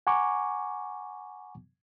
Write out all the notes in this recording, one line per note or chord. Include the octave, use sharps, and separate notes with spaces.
F#5 G#5 A#5 C#6 D6